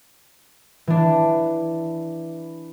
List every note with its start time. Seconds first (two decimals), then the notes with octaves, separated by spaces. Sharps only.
0.87 E3 D4